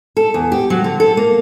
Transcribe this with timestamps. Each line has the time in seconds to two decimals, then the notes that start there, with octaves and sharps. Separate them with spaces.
0.17 A4
0.34 E2
0.52 G4
0.70 F#3
0.84 D3
1.00 A4
1.17 A#3